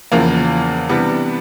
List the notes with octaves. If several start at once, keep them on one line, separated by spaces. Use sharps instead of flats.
E2 C#3 F3 A#3
C3 E3 G3 B3 D4